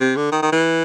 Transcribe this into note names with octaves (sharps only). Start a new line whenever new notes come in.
C3
D3
D#3
D#3
E3